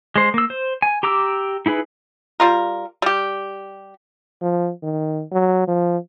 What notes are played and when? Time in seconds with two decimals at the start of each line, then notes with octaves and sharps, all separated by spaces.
0.16 G#3 C5
0.34 A#3 E6
0.50 C5
0.82 G#5
1.03 G4 A#5 D6 E6
1.66 D#4 E4 G#4 B4
2.40 G3 F4 A#4
3.02 G3 G4
4.42 F3
4.83 D#3
5.32 F#3
5.68 F3